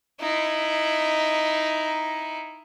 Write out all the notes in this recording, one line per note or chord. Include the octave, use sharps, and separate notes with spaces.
D#4 E4